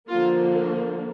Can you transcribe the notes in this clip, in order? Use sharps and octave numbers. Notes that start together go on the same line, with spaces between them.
D3 F3 A#3 F4